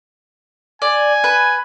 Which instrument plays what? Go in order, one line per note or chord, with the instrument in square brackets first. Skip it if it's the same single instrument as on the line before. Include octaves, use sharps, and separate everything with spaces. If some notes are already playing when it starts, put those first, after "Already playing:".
[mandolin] D5 [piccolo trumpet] G#5
[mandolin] B4